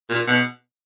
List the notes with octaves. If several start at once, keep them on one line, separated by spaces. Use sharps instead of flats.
A#2
B2